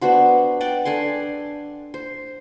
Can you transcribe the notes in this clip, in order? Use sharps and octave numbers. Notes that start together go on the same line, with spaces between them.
B3 D4 F#4 C5
D5 F#5 G5 D6
D4 A4 G#5 C6
C5